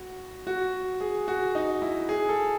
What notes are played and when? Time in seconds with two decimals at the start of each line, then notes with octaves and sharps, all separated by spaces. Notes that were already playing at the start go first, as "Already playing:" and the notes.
Already playing: F#4
0.47 F#4
1.01 G#4
1.28 F#4
1.55 D#4
1.82 E4
2.09 G#4
2.29 A4